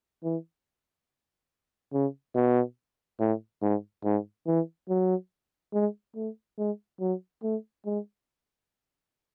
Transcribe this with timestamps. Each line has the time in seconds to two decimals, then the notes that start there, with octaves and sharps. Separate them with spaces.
0.24 E3
1.93 C#3
2.35 B2
3.20 A2
3.62 G#2
4.05 G#2
4.47 E3
4.89 F#3
5.74 G#3
6.16 A3
6.58 G#3
7.00 F#3
7.43 A3
7.86 G#3